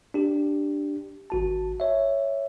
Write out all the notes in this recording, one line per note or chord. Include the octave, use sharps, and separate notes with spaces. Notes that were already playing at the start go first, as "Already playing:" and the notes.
D4 G4
G#1 F#4 A5
C#5 E5